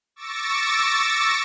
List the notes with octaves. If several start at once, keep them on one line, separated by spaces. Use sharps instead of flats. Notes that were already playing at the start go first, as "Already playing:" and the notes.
C#6 D6 E6 A6 A#6 C#7